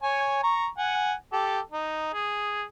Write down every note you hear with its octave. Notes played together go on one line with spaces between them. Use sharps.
C#5 G#5
A#5 C#6
F#5 G#5
G4 A4
D#4
G#4